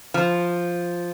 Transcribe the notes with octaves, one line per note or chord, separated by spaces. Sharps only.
F3